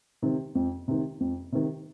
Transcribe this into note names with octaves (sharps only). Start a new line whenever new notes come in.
C3 D#3
F2
C3 D#3
F2
C3 D#3